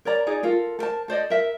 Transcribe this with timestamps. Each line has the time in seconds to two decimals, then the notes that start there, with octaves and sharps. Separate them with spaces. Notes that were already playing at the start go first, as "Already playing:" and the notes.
0.05 A#4 C#5 D5 A#5
0.27 D#4 G#4 D5
0.43 F4 A4 A#4
0.79 A4 A#4 C5 A5
1.08 A4 C5 D5 D#5
1.30 A#4 E5